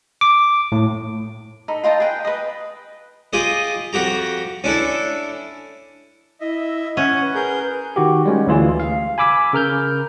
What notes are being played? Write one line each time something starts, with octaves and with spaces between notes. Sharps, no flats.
D6
A2
D#4 A4 B5
F4 D#5 G5 A5
G#4 B4 G5
B4 D#5
F4 G4 G#4 D#5
F2 F#4 G4 A#5
C#4 D4 E4 A4
E4 D#5 E5
C#4 F#5
B4
G#4 A#4 G6
D#3 F#4 G4
G3 G#3 C#4
D2 E3 F4 G#4
F5
G#5 B5 D6 E6 B6
C#3 A#4 F6 G6